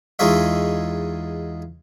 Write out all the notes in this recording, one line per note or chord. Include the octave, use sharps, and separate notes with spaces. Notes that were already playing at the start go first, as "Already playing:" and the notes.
E2 G#3 D#4 F4 C#5 E5